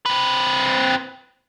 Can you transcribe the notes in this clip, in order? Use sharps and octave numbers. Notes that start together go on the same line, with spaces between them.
C4 B4